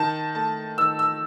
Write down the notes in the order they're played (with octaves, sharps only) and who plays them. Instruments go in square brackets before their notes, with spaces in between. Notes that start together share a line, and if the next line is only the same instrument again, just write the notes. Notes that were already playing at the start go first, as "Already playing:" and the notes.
Already playing: [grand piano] D#3 A5
A3 A5
D#3 E6
E6